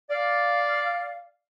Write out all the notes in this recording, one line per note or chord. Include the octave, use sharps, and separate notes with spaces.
D5 F5